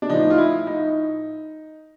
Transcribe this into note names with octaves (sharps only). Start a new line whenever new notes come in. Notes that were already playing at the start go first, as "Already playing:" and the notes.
D4
A2 F3 D#4
F4
E4
D#4